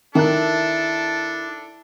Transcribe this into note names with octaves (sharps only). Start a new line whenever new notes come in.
D#3 D4 E4 A4 F#6